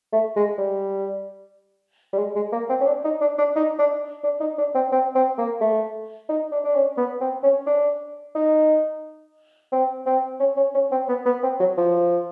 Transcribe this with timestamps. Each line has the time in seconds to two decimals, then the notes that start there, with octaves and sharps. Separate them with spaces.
0.13 A3
0.36 G#3
0.58 G3
2.13 G3
2.18 G#3
2.35 G#3
2.52 A#3
2.69 C4
2.80 C#4
2.86 D4
3.04 D#4
3.21 D4
3.38 D4
3.56 D#4
3.79 D4
4.24 D4
4.40 D#4
4.58 D4
4.75 C4
4.92 C4
5.15 C4
5.38 A#3
5.61 A3
6.29 D#4
6.52 D4
6.64 D4
6.75 C#4
6.97 B3
7.21 C4
7.43 C#4
7.67 D4
8.35 D#4
9.72 C4
10.06 C4
10.40 C#4
10.57 C#4
10.75 C#4
10.92 C4
11.09 B3
11.26 B3
11.43 C4
11.60 F#3
11.78 F3